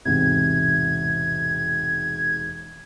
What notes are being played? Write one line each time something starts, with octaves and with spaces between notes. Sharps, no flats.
E1 G#2 C3 G#6